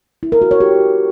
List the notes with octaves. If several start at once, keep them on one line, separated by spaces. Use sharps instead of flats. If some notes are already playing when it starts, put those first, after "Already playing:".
E4
A#4
F#4
C#5
G4